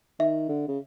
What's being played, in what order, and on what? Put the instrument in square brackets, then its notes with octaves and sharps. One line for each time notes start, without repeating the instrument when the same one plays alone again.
[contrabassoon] D#3 [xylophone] E5
[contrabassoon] D3
C#3